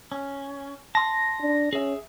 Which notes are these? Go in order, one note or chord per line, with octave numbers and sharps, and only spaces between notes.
C#4
A5 C6 A#6
D4
C#4 G#4 E5